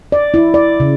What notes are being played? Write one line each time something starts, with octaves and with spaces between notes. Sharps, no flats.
D5
E4
D5
C#3